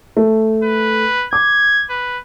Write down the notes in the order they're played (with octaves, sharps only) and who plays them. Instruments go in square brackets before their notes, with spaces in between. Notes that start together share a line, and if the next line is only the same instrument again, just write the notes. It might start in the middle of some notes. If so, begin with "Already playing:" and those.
[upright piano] A3
[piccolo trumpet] B4
[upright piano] D6 [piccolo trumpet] G#6
[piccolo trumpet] B4